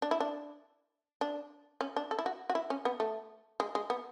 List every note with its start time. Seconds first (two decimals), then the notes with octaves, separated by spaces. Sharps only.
0.02 D4
0.11 E4
0.20 D4
1.21 D4
1.81 C#4
1.96 D4
2.11 A4
2.19 E4
2.26 F#4
2.50 F#4
2.55 E4
2.70 C#4
2.85 B3
3.00 A3
3.60 G#3
3.75 G#3
3.90 B3